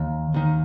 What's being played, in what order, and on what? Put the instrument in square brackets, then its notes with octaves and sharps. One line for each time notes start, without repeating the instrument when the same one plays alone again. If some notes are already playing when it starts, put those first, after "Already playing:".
Already playing: [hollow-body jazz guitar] D#2
D#2 D#3